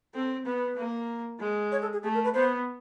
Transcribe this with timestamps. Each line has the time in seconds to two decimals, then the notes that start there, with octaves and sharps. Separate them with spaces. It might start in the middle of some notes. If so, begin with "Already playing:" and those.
0.14 C4 A4
0.46 B3 B4
0.77 A#3
1.40 G#3
1.72 C#5
1.82 A4
1.93 G#4
2.03 A3 G#4
2.14 A#4
2.24 B4
2.34 B3 C5